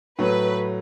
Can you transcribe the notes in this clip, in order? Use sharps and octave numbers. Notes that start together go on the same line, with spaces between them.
A2 F#3 A3 B4